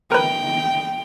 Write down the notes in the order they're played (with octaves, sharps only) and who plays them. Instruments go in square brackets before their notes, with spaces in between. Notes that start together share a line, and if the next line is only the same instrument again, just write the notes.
[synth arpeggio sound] A#4 B4 [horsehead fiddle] G5